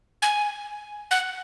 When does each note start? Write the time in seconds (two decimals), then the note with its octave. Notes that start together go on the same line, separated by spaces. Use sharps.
0.22 G#5
1.11 F#5